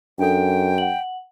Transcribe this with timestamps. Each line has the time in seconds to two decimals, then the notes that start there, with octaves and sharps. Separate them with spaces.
0.19 F#2 D4 A4 G5
0.78 F#5 F#7